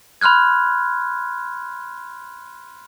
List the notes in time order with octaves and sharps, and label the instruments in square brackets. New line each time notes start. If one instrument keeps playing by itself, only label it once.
[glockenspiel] B5 C6 F6 F#6 G#6